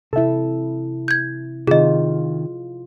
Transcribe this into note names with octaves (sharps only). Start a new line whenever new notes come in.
C3 E4 A4 E5
G6 G#6
C3 D#3 F4 G#4 D#5